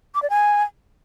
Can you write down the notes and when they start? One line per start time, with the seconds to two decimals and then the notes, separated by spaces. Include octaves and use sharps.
0.15 D6
0.22 D5
0.30 G#5